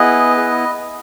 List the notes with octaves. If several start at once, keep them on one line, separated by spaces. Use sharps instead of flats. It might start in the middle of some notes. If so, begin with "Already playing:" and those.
Already playing: B3 E4 G#4 B4 D#5
G#4